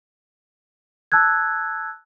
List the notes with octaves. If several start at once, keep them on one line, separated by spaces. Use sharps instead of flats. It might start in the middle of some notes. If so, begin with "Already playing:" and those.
A5 E6 F#6 G#6